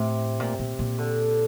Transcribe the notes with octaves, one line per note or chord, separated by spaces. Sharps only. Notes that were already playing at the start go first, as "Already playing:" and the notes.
Already playing: A2 C3
A#2
A#2
A#2
D3